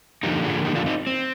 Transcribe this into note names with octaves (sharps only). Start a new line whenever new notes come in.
D3 F3 A#3 D#4 G4
F4 G#4
D#4 G4
D4 F4
C4 D#4
C4